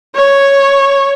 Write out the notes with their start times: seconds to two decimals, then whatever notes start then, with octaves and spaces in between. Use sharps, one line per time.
0.15 C#5